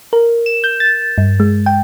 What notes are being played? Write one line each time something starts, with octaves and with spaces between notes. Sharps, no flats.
A#4
E7
G6
A6
G2
G#3
G5